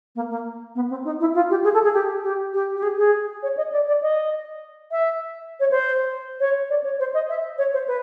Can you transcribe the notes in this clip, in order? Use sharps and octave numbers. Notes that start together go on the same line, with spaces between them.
A#3
A#3
B3
C4
D#4
E4
F4
G4
G#4
A4
G#4
G4
G4
G4
G4
G#4
G#4
C#5
D#5
D5
D5
D#5
E5
C#5
C5
C#5
D5
C#5
C5
D#5
E5
C#5
C5
B4